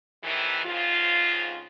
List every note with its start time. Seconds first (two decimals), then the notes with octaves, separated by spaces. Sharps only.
0.23 A2 C3 D#3 E3
0.65 F2 G#2 C#3 F4